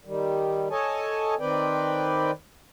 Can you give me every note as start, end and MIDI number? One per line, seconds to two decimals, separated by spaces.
0.05 0.68 51
0.05 0.68 55
0.71 1.34 69
0.71 1.34 73
0.71 1.34 75
0.71 1.34 80
0.71 1.34 81
1.39 2.31 51
1.39 2.31 60
1.39 2.31 71
1.39 2.31 74
1.39 2.31 79